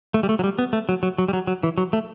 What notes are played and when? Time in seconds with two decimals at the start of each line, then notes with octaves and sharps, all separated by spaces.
0.14 A3
0.23 G3
0.29 A3
0.39 F#3
0.44 G3
0.59 B3
0.73 A3
0.89 F#3
1.03 F#3
1.18 F#3
1.28 G3
1.33 F#3
1.47 F#3
1.63 E3
1.78 F#3
1.93 A3